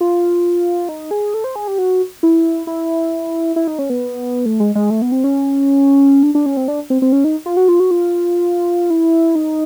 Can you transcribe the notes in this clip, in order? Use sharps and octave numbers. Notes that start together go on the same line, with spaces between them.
F4
D#4
G#4
A4
C5
G#4
G4
F#4
E4
E4
E4
D#4
C#4
B3
A3
G#3
G#3
A3
B3
C4
C#4
D4
D4
C#4
C4
D4
C4
C4
C#4
D#4
F4
F#4
F4
F#4
F4
E4
D#4